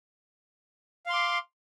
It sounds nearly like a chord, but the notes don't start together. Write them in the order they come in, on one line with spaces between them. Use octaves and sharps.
F5 C6 D6